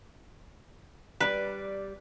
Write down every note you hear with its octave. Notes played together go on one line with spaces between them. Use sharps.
G3 B4 D5